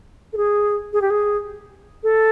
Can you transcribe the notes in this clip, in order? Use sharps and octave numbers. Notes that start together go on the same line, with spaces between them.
A4
G#4
G#4
G4
G#4
A4